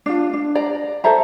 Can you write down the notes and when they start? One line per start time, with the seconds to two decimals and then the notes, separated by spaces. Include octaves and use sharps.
0.06 D4 F4
0.33 D4
0.55 D5 A#5
1.04 A4 C5 E5 A#5